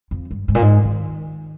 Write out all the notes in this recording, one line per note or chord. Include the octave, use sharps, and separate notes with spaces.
F2
G2
G#2
A#2
G#2
D#3